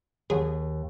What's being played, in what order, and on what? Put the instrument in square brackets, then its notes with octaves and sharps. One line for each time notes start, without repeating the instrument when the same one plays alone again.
[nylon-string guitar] D#2 [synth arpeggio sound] F#3 G#4